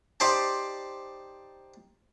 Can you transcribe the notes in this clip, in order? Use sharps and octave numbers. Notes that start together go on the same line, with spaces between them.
D#4 G4 C5 D5 A5